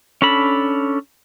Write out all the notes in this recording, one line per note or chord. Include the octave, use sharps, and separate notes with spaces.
C#4 D4 A4 B5